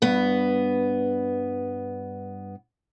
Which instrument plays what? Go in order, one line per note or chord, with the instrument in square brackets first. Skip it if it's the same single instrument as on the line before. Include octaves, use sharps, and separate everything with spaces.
[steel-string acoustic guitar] G2 B3